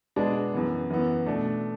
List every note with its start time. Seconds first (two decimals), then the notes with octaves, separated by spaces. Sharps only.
0.16 B2 G#3 B3 D4
0.53 F#2 E3 B3
0.90 F#2 E3 B3
1.26 B2 A3 D4